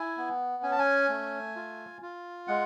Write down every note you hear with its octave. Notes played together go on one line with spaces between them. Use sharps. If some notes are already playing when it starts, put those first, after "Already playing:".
Already playing: E4 G#5
B3
C#4 G#5
A5
G#5
A3
F4
F4
G#3 F#5